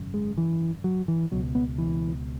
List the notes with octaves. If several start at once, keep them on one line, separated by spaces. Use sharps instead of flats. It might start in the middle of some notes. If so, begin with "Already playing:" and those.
Already playing: G#1 F#2 C#3
G#3
E3
F#3
E3
C#2 B2 F#3
B3
E3